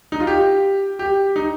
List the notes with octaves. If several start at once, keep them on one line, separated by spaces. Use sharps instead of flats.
D#4
F4
G4
G4
D#4